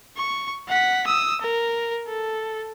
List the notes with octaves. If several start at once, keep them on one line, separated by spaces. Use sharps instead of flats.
C#6
F#5 B6
D#6 E6
A#4
A4